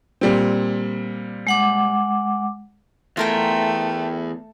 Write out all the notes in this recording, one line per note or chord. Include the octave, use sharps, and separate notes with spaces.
A#2 G3 C4
G#3 F#5 D6
E2 A3 F4 A#4 G5